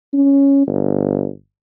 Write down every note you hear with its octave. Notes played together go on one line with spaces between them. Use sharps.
C#4
G1